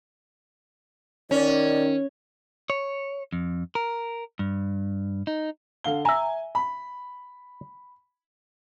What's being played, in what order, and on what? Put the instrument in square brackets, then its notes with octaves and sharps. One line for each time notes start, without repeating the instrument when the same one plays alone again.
[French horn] D#3 [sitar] C#4 [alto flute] D5
[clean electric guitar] C#5
F2
A#4
G2
D#4
[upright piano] D3 F5 G7
[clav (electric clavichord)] E5 A#5 [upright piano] G#5
[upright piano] B5